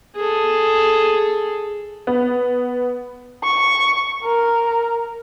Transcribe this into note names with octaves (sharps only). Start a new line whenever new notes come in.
G#4 A4
B3
C#6
A#4